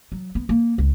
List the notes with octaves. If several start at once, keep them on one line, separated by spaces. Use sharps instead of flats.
F#3
B3
A#3
C#2